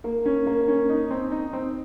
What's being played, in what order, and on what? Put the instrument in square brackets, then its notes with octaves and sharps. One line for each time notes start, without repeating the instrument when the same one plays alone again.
[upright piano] A#3
C#4
A#3
C#4
D#4
C4
D#4
C4